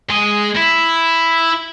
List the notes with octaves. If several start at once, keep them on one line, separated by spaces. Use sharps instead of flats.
G#3 D#5
E4